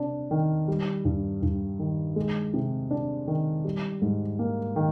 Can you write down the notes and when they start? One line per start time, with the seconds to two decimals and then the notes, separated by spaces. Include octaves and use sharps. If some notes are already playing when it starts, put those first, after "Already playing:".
Already playing: C3 D4
0.31 D#3
0.68 G3
1.05 G2
1.42 G2
1.79 D#3
2.16 G#3
2.54 C3
2.91 D4
3.27 D#3
3.65 G3
4.02 G#2
4.39 A#3
4.76 D#3